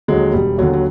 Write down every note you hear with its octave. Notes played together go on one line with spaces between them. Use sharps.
D#2 D3 F#3 G#3
E1 G3
D#2 D3 F#3
F#3